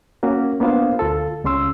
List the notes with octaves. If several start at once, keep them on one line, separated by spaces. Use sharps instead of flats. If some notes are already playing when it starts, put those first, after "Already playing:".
A#3 C#4 F#4
A#3 B3 D4 F4 C5 F5
D2 F4 A4
C#2 C#3 C#4 C6 E6